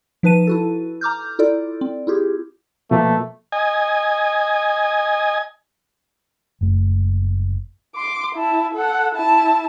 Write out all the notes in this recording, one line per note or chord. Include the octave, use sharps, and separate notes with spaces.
F3 D#4 B4 A5 D#7
E4 F#4 A4
A#5 D6 F6 G6
E4 F4 A4 D5
C4
E4 F4 G4 G#4
B2 F3 A3 A#3
D#5 G#5
F#1 F#2 A3
C6 D6
E4 A5
A4 F#5
E4 A5